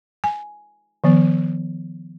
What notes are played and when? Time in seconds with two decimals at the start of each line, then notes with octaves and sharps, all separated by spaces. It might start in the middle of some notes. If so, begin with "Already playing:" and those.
0.24 G#5
1.04 D#3 F3 B3